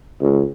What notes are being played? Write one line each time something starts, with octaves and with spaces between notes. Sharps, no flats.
C#2